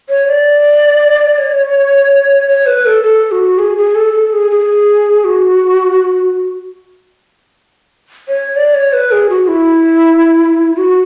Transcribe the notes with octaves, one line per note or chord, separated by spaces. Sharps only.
C#5
D5
C#5
C#5
B4
A4
A4
F#4
G#4
G#4
A4
A4
G#4
G#4
F#4
C#5
D5
C#5
B4
G#4
F#4
E4
F#4